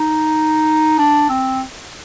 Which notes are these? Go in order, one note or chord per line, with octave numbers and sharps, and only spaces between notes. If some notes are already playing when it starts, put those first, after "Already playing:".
Already playing: D#4
D4
C4